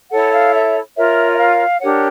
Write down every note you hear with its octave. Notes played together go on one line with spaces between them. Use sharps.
E4 A4 C#5 F#5
F5
E5
F4 A#4 C#5 E5
E5
F5
D4 G4 A#4 C#5 F#5